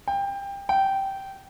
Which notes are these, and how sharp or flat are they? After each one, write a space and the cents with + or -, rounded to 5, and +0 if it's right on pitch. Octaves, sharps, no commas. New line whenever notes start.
G5 +20
G5 -15